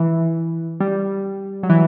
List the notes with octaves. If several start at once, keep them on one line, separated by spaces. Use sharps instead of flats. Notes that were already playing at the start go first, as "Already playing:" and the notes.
Already playing: E3
G3
F#3
E3